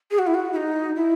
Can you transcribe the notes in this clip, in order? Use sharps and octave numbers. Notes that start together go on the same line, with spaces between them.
G#4
F#4
E4
F#4
E4
D#4
E4